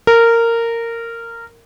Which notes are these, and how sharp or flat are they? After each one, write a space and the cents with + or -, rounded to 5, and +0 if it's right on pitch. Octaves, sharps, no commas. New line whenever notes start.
A#4 -15